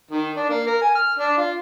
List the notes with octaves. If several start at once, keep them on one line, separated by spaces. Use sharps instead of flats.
D#3
D4
A#3
A#4
G#5
F6
D4
F4